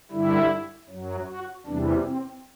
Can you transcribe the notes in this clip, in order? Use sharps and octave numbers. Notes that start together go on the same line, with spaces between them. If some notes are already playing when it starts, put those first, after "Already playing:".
G2 D3 G3 E4
F#2 F#3
F#4
E2 C3 E3 G3 D4
C4